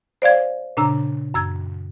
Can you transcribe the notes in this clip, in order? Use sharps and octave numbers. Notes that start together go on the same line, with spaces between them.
C5 D5 F5 G#6
A#2 C#3 D4 A#5 E6
F#2 E6 G#6